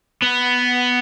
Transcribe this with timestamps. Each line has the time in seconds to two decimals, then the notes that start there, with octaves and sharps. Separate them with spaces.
0.22 B3